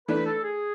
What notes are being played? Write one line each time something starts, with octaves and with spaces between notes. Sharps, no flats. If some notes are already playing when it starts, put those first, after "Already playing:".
E3 A3 D4 B4
A4
G#4